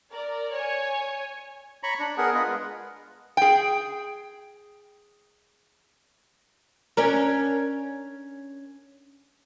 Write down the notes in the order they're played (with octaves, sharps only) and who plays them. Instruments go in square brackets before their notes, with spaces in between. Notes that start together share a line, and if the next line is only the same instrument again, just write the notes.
[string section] A#4 D5
C#5 G#5
[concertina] C#5 A#5 B5 C#6
D4
B3 G#4 A#4 F#5
F4 B4 D#5
G#3
[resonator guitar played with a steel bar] G#4 G5
[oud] C#4 D4 A#4